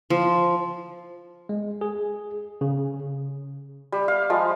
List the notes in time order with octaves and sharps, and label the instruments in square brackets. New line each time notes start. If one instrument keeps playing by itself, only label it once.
[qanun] F3
[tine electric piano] G#3
G#4
C#3
[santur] G3
F5
F3 G#3